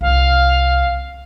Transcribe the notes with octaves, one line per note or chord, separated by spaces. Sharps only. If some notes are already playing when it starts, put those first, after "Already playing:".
C2 F5